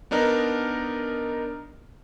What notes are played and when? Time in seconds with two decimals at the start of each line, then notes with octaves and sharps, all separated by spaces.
0.11 B3 D4 D#4 A#4